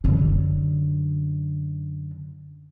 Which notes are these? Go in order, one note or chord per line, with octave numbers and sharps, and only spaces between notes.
F#2 D3